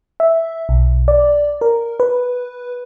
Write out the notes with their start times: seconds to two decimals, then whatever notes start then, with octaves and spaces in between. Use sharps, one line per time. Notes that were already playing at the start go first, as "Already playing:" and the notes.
0.20 E5
0.69 B1
1.08 D5
1.61 A#4
2.00 B4